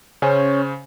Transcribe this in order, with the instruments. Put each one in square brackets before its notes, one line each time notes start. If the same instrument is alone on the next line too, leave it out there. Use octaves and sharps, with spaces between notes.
[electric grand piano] C#3 C5 [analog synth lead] C#4